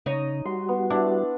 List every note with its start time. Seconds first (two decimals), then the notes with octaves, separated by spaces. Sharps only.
0.06 C#3 D#4 C#5
0.45 G3 F#4 C6
0.69 B3
0.90 D4 E4